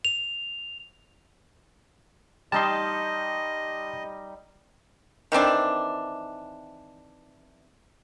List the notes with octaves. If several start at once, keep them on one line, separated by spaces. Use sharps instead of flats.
F7
G3 D#4 D#5 A5 C6
D#3 E3 C4 D4